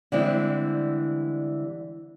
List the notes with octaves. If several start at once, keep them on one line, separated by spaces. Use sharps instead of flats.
D3 E3 G3 G#3 C4